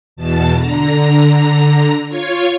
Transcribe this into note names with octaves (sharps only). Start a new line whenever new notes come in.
E2 B2 A5
D3 A#5
F4 C#5 G#6